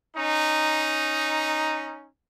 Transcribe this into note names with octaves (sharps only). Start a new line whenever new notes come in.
C#4 D#4